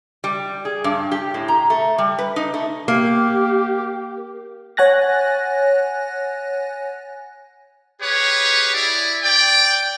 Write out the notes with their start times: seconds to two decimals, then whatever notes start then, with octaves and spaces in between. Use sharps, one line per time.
0.24 G3
0.65 G#4
0.84 G2
1.12 G4
1.34 A2
1.48 A#5
1.70 A3
1.98 G3
2.19 B4
2.36 D#4
2.54 A3
2.88 A#3 G4
4.77 C#5 F#5 G#5 F#6 A6 A#6
8.01 G4 G#4 B4 C#5
8.74 E4 G#4 D5
9.23 D5 G5